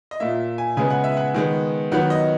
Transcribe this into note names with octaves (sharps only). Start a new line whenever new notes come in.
D#5
A#2 A#3 E5
G#5
C#3 G#3 B3 G#5
F#5
E5
F#5
D#3 G#3 B3
D#3 F#3 B3 F#5
D#5